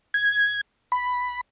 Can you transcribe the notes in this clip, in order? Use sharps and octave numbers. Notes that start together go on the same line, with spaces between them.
G#6
B5